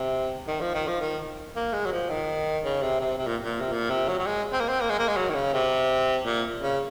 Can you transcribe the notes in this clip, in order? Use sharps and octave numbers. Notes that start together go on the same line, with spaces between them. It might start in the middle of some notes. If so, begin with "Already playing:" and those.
Already playing: C3
D#3
F3
D#3
F3
D#3
A#3
G#3
F#3
F3
D#3
C#3
C3
C3
C3
A#2
A#2
C3
A#2
C3
F#3
F#3
G#3
C4
A#3
C4
A#3
G#3
A#3
G#3
F#3
D#3
C#3
C3
A#2
C#3